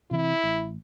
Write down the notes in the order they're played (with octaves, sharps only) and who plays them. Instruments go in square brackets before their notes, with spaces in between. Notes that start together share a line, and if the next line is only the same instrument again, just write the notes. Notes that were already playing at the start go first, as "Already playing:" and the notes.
[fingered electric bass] C3 E3 C4 [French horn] E4
[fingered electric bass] A1